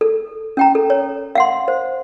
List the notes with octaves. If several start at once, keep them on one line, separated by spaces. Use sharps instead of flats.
A4
C#4 G5 A#5
A4
C#5
F5 F#5 C6
C5